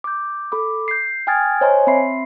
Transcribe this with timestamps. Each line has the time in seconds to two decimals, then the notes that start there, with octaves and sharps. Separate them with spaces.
0.04 D6 G6
0.52 A4 B5 D6
0.88 G6 C7
1.27 G5 G#5 D#6 F6 G#6 A6
1.61 C5 C#5 D#5 G#5 A#5 C6
1.87 C4 E5 B5 C6 C7